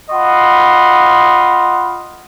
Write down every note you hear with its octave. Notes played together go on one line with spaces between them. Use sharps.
F4 D#5 F#5 B5 C6